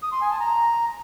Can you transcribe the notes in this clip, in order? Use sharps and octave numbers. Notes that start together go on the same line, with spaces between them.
D#6
C6
G#5
A5
A#5